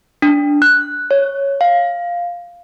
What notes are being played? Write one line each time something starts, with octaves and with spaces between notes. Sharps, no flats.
D4
F#6
C#5
F5